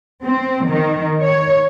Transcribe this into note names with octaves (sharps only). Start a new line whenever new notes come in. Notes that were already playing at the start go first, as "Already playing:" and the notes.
C4
D#3
C#5